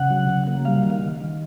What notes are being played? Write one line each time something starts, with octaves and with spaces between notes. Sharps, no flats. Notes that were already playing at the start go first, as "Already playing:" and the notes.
Already playing: C#3 F#5
F#3
C#3
A#3
G3 F5
D#3
F5
D#3
D#3